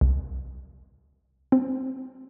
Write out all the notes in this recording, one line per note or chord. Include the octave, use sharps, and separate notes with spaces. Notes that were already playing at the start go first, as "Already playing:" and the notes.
C2
C4